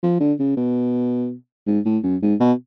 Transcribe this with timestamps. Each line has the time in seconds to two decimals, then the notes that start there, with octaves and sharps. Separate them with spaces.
0.03 F3
0.20 D3
0.40 C#3
0.57 B2
1.67 G#2
1.85 A2
2.03 F#2
2.22 G#2
2.40 B2